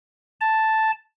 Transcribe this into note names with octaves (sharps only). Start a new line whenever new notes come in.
A5